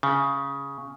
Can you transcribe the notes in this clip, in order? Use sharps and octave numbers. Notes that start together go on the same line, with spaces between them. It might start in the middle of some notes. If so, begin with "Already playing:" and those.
C#3